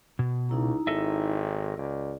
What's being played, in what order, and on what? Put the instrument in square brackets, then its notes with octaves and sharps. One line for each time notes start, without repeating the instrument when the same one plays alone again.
[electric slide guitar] B2
[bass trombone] C#2 [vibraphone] D#4 E4 A#5
[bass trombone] G#1 [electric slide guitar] A4 D#5 E5
[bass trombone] C#2 [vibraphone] D5